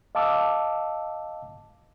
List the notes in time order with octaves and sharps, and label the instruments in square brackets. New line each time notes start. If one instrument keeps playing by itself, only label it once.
[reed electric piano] D#5 F5 A5 D6 E6